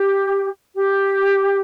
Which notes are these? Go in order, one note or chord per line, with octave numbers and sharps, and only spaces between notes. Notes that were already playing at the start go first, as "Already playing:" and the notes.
Already playing: G4
G4